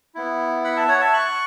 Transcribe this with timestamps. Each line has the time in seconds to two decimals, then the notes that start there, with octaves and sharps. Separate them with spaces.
0.15 B3 E4
0.64 F#5 B5
0.76 E5 A5
0.88 C#5 F#5
1.00 E5 A5
1.13 C#6 F#6